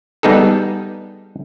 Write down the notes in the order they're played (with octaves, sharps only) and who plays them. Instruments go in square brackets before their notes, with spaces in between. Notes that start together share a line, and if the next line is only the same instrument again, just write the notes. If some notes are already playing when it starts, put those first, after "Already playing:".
[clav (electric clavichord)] G3 B3 D#4 G#4 A4